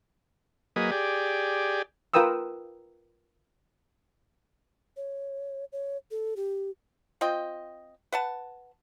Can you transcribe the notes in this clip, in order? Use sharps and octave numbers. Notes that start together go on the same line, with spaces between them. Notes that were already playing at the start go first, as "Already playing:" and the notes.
F#3 A#3 G#4 B4 D#5
G4 G#4 D5
F4 A#4 B4 G5 D#6 E6
C#5
C#5
A4
G4
C4 F4 D#5 G5
B4 F#5 A5